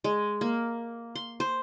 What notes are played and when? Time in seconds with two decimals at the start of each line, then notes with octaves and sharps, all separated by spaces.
0.04 G#3
0.41 A#3
1.15 C6
1.40 C5